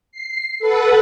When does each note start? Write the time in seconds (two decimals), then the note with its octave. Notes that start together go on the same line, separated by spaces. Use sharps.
0.12 C7
0.59 A4 B4 F#5